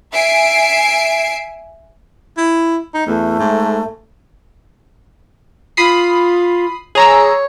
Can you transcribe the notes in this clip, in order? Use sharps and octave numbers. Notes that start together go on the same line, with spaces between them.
E5 G#5 C7 D7
E4
D#4
E2 A3
G#2
F4 B5 D#6 C7
G#4 C#5 A#5 E6